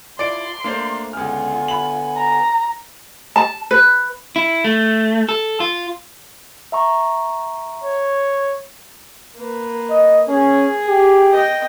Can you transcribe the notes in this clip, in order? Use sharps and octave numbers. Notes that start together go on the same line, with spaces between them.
E4 F4 D5 C6 D7
A3 A#3 D4 C5
C#2 D3 B3 F4 G#5 F6
B5 F#7
A#5
A5
B4
E4
A3
A4
F4
E5 A#5 C#6
C#5
A#3 B4
D#5
C#4 G#4
G4
D#5 G5